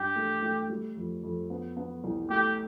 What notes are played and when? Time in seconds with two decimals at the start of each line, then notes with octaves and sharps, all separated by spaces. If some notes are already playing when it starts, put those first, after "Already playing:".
Already playing: G2 G4
0.16 A3
0.42 A3
0.69 G3
0.97 F2
1.23 F2
1.50 B3
1.77 B3
2.04 C2
2.30 A3 G4